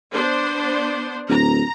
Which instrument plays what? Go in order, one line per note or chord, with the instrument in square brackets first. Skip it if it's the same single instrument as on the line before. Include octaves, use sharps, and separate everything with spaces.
[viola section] B3 D4 C5
[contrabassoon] D1 [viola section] A#5